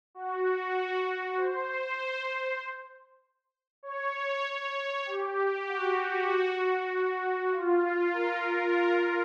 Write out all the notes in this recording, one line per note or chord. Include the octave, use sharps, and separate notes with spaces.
F#4
C5
C#5
C#5
G4
F#4
F4
A#4